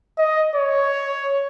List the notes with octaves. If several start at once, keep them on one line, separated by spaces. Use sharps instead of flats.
D#5
C#5